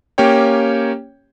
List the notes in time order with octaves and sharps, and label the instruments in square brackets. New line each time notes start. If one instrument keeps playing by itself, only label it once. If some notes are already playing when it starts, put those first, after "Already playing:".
[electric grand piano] A#3 C#4 G4 C#5 G5